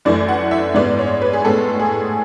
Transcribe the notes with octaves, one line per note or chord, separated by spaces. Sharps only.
F#2 E3 A3 D5
F#5
E5
G#2 G#3 B3 D5
C#5
B4
G#4
A2 G#3 B3 A4
G#4